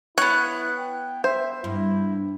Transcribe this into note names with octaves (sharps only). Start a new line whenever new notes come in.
B3 E4 C#5 F#6
G5
C5 E5
G2 E4